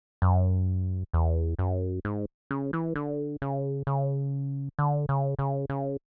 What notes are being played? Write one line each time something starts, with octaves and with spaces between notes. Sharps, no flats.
F#2
E2
F#2
G#2
C#3
E3
D3
C#3
C#3
D3
C#3
C#3
C#3